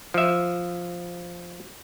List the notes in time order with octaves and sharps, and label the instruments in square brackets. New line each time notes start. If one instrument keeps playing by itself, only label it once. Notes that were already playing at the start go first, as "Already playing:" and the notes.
[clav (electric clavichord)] F3 E5